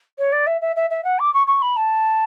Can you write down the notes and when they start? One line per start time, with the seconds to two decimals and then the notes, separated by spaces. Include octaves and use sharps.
0.18 C#5
0.32 D5
0.47 E5
0.61 E5
0.76 E5
0.90 E5
1.04 F#5
1.19 D6
1.34 C#6
1.47 C#6
1.62 B5
1.76 A5